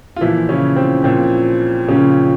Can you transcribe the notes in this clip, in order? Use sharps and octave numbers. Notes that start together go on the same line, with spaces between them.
F4
A#2 E3 F3 E4
C#3 C#4
C4
A#2 F3 C4
A#2 C#3 F3 C#4